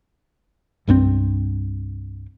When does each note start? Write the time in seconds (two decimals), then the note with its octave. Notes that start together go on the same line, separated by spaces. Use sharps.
0.87 C2 G2 F#3 C4